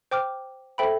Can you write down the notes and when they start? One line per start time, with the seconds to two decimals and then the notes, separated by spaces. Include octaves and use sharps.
0.11 C5 G5 D6 F6
0.78 A4 C5 E5 G5 B5